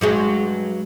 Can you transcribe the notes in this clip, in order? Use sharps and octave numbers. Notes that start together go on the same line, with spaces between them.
G2 F#3 G#3